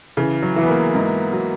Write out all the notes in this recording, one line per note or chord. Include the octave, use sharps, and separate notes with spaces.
C#3 E3
F#3
E3
B3
A#3
G#2
F#3